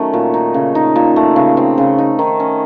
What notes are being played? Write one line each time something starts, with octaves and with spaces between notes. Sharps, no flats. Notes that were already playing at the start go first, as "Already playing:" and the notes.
Already playing: D#3 F#3 A3 C#4
A#2
D#4
C#3
D#4
A#2
A3
C#3
C4
C#3
D#4
D#3
C#4